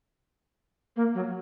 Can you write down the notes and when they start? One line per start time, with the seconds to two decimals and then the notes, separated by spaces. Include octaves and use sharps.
0.96 A#3
1.14 F#3